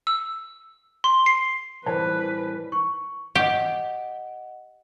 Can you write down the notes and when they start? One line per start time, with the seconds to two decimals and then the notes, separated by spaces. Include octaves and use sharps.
0.07 E6
1.04 C6
1.26 C7
1.86 A2 E3 G3 C4 A#4 B4 C#5 A5
2.72 C#6
3.35 G4 D#5 F#5